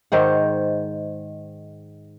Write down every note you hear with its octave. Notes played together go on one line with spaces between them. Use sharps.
G#2 D#3 C5 F#5